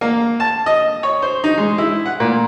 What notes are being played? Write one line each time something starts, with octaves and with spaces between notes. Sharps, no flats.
A#3
A5
D#5
C#5
C5
D#4
G#3
E4
F#5
A#2